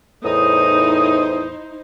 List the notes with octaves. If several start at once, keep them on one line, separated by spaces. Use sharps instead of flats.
E2 A2 D#4 E4 C5 D#6